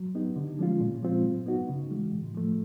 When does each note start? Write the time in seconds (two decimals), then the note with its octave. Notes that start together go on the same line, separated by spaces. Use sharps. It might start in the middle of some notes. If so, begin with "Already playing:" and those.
Already playing: F#3
0.15 B3 D#4 G4
0.36 D3
0.59 F3 G#3 C#4 F4
0.80 A#2
1.02 F3 G#3 C4 F4
1.25 F#3
1.46 B3 D#4 F#4
1.69 C#3
1.90 E3 G#3
2.12 A2
2.35 F3 A3